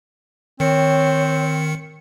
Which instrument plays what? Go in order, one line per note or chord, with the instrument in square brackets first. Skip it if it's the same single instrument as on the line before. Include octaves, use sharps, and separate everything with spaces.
[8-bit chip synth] D#3 C#7 [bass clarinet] C4 [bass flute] C#5